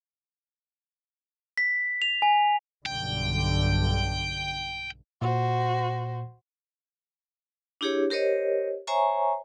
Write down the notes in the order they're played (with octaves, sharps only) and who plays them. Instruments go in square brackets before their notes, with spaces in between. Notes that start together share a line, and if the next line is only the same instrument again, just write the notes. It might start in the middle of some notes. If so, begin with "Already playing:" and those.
[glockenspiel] B6
F7
G#5
[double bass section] B1 G2 D3 [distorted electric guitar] G5
[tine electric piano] A#2 [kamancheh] F#4 C5
[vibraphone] D4 E4 G4 G#4 C#5
G4 A#4 C5 C#5 D#5
C5 C#5 E5 G#5 A#5 C#6